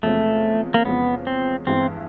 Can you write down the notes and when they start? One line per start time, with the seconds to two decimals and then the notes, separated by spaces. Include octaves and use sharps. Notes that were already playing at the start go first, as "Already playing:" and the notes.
0.03 E2 C3 F3 G#3 A3 C#4
0.74 A#3
0.85 E2 C3 F3 G#3 B3 C#4
1.27 C4
1.67 G2 E3 G#3 B3 C4 E4